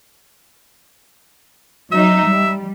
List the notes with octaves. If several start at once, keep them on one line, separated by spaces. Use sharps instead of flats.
F#3 D#4 E5
G3